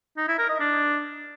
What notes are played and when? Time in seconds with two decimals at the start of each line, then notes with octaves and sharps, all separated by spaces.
0.17 D#4
0.28 E4
0.39 A#4
0.49 D#5
0.60 D4